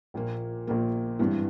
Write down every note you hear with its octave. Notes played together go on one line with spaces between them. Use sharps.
A#1 A#2 A#3
A#1 A#2 A#3
G#1 G2 E3